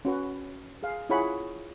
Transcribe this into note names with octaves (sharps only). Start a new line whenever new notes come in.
C#4 F#4 B4
G#4 F5
E4 F4 G#4 C#5 F#5 B5